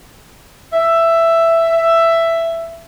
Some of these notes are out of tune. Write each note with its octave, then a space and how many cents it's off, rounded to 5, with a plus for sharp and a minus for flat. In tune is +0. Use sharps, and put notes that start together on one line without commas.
E5 +10